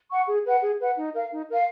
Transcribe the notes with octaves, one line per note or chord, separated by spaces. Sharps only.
F#5 C#6
G#4
B4 F#5
G#4
B4 F#5
D#4
A#4 F5
D#4
A#4 F5